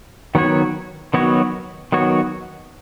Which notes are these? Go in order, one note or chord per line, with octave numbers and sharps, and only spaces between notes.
D#3 F#3 B3 F#4 C#5
D#3 F#3 B3 F#4 C#5
D#3 F#3 B3 F#4 C#5